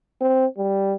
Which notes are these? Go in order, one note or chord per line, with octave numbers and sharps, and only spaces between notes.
C4
G3